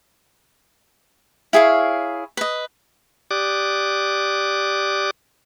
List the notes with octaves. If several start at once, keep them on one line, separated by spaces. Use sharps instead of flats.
E4 G#4 C#5 F5
B4 D#5
G4 D5 D6 D#6 F#6